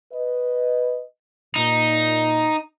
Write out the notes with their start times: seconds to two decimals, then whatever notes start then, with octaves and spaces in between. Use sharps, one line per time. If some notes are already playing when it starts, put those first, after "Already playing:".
0.12 B4 D#5
1.56 A#2 D#4